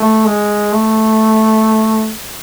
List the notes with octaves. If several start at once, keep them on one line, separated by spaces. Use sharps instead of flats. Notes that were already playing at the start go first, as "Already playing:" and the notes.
Already playing: A3
G#3
A3